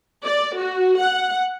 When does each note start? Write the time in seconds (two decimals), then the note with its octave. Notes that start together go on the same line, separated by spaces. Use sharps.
0.25 D5
0.58 F#4
1.00 F#5